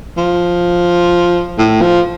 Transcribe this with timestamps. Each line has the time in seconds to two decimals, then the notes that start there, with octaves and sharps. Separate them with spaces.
0.18 F3
1.58 A2
1.82 F3